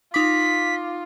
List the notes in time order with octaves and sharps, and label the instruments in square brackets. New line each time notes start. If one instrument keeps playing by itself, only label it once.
[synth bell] D#4 D6 [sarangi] F4 [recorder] B6